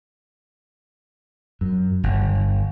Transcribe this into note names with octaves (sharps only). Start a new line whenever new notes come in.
F#2
G1